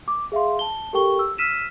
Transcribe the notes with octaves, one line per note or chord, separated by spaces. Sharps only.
D6
G#4 E5 F5 C6
A5 G7
G4 A4 A#4 G5 C#6 G7
E6
E6 F6 B6 D#7 E7